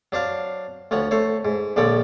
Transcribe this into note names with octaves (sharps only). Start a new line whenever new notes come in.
F#3 D4 C5 F5
D2 F3 C#5 F#5
A3 C5 C#5
G#2
A#1 D3 F3 C#5 D5 G5